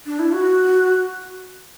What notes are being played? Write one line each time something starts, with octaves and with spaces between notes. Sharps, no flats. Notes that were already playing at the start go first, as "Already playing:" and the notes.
D4
E4
F#4